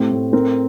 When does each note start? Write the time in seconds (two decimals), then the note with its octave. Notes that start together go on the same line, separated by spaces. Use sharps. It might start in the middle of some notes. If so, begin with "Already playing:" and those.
Already playing: A2 C4 G4
0.11 A2
0.33 C4 A#4